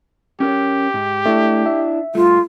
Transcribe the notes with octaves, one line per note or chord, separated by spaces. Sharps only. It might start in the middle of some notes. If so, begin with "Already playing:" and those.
C#4 G4 A#4 C#5
G#2
A3 D4 E4
E5
G2 A3 F4